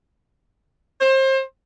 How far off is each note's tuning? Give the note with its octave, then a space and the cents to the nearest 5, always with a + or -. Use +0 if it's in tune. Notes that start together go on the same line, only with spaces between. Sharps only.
C5 +30